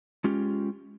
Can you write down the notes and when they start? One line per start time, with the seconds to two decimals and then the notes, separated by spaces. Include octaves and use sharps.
0.24 G#3 C#4 F4 G4